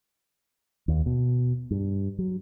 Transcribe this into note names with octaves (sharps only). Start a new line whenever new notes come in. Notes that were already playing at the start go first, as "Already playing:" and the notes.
D#2
B2
G2
F#3